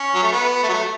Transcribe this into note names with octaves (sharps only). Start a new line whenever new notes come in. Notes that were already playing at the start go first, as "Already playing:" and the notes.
Already playing: C#4
F#3
A3
B3
A3
F#3
A3